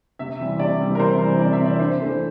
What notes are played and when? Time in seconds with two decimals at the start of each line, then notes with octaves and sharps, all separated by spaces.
0.19 C3 E5
0.39 E3 G3 C4
0.59 C3 D5
0.79 E3 G3 C4
0.95 A#4
0.99 C3 C5
1.19 E3 G3 C4
1.39 C3 D5
1.53 E5
1.59 E3 G3 C4
1.66 D5
1.79 G2 C5
2.00 E3 A3